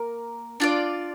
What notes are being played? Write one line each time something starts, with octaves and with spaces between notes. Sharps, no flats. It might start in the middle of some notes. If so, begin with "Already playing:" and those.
Already playing: A#3 A#4
D4 F4 D5